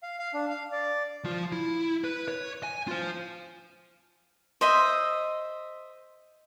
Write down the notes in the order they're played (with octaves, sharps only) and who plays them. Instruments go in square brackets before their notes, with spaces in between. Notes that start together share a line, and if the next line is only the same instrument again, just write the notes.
[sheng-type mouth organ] F5
F5
D4
F5
D5
[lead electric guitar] F3 F4
E4
B4
C#5
G#5
F4 C5
[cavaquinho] C5 D#5 E5